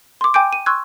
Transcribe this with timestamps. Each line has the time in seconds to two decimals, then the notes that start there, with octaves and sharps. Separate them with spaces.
0.21 C6 D6
0.34 G5 G#5 D6 G6 D7
0.53 D#7
0.66 C6 C#6 E6 F#6 G#6